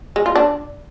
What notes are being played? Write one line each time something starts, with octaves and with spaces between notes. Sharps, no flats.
G#3
F4
D4